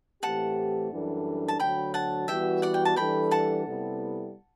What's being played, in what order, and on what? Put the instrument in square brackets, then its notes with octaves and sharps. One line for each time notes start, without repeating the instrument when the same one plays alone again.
[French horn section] A2 E3 A3 C4 G4 [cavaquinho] F#5 A5
[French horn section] F#2 E3 G3 D4 A4
[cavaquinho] A5
[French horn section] D2 D3 F#3 [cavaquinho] G5 B5
[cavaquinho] F#5 A5
[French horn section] E3 G3 B3 F#4 B4 [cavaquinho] E5 G5
[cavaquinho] D5 F#5
G5
A5
[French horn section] E3 G3 D4 A4 [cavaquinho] G5 B5
[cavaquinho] F#5 A5
[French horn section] C3 G3 B3 E4 A4